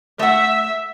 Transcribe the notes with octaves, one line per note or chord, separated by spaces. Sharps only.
A3 E5 F#5